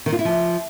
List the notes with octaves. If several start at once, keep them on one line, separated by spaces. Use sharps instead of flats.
D#3
F4
E4
F3